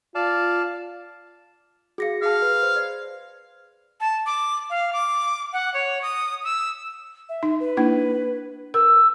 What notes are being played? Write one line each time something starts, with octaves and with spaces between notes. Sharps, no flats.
F4 D5 F5 A5
F#4 G#4 F5 A#6 C#7
G#4 F5 A5
B4
C5
D5
A5
D6
F5
D6
F#5
C#5
D#6
E6
E5
D#4
B4
A#3 D4 E4
A#4 E6